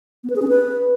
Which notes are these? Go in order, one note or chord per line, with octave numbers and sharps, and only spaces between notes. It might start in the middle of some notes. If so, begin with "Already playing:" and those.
B3
B4
G#4
C#4
B4